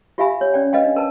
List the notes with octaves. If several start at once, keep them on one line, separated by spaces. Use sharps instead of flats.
F4 G4 E5 F5 G#5 B5
C#5
C#4 D5 G5
B4 D#5 F5 G5
D4
A#4 B4 A5